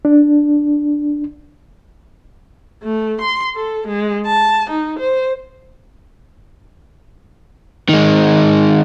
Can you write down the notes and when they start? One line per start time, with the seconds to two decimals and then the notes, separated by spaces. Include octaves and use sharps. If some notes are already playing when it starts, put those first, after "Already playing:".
0.05 D4
2.84 A3
3.21 C6
3.55 A4
3.87 G#3
4.27 A5
4.70 D#4
4.99 C5
7.89 D#3 G#3